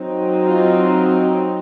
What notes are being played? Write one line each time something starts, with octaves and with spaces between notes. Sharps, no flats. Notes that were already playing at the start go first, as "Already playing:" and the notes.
Already playing: F#3 C4 D#4
F4